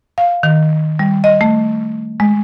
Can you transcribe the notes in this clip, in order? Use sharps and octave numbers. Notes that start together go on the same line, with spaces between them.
F5
D#3
G3
D#5
A3
G#3